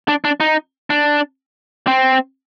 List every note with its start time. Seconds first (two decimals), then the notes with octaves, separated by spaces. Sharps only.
0.08 D4
0.25 D4
0.40 D#4
0.90 D4
1.87 C4